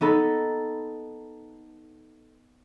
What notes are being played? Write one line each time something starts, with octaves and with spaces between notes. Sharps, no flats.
B3 D#4 A4 B5